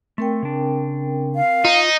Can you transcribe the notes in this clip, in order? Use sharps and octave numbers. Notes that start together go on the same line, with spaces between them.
A3 C4 A#4 G5
C#3 D4
F5
D#4 F4 A#5